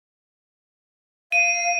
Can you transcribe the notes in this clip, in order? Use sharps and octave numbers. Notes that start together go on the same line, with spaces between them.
F5 D#7